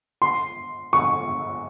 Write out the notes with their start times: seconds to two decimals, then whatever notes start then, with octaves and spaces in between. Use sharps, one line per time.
0.22 C6
0.93 C#6